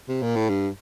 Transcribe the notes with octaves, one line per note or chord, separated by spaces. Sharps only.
C3
A#2
A2
G2